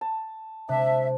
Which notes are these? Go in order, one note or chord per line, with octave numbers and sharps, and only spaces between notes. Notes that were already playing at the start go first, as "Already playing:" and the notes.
A5
C3 G#3 D4 E5